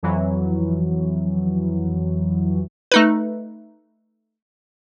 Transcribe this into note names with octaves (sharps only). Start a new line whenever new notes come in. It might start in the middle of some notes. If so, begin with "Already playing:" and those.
F2 E3 F#3
A3 D#4 B4